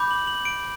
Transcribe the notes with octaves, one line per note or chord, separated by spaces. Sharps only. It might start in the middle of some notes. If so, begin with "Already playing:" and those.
Already playing: B5 D6 G6
F#7
F#7
D7